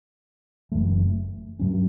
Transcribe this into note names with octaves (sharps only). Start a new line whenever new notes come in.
F#1 F#2 E3 A3
G2 F#3 C#4